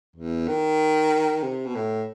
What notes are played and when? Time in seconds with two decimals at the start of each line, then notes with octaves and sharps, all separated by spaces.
0.16 E2
0.48 D#3
1.43 C3
1.66 B2
1.75 A2